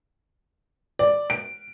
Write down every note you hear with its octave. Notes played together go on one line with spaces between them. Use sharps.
D5
D7